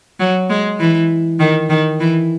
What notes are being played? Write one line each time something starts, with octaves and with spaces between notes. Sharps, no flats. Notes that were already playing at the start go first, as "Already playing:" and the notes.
F#3
G#3
E3
D#3
D#3
E3